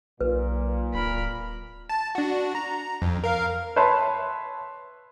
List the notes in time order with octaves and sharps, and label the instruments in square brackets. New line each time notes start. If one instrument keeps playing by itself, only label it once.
[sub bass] B1 [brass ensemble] A#2 [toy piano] B4
[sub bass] D1 [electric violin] A#4 B5
[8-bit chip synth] A5
D4 F#4
A#5
F2
A#4 F5
[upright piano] B4 C#5 E5 A5 B5 C6